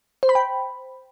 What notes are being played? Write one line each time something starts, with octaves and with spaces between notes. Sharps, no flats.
C5
B5
G5